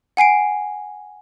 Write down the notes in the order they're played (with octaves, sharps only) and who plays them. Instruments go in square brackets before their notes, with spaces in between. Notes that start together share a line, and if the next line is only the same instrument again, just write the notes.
[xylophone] F#5 G#5 C7 D7